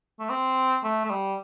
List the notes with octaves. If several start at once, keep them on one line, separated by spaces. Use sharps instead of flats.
A3
C4
A3
A3
G3